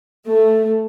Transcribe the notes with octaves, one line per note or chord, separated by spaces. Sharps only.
A3